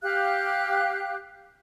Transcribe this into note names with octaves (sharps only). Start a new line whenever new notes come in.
G4 F5 F#6